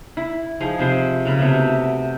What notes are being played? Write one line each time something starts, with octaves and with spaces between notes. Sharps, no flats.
E4
F3 D#4 G#4
C3 F3 C5 C6
C#3 A#4 B5
C3 A3 B3
F#4